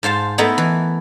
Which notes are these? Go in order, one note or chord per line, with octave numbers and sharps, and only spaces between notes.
G#2 F4 C5 A5
A3 B3 D#4 E4 A4 A#4
E3